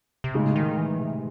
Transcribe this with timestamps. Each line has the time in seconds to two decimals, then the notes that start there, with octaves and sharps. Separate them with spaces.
0.24 C3
0.34 A2 C#3 G#3 D#4
0.56 D#3
0.77 E3
0.99 C3